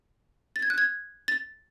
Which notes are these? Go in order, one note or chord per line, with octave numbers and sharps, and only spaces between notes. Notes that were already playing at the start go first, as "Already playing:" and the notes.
A6
G#6
F#6
G#6
A6